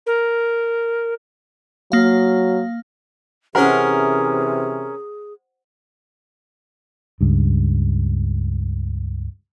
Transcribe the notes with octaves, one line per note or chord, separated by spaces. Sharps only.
A#4
F#3 A#3 F5
C3 E3 C#4 G#4 A#4 C5 F#5 C6
C#2 G2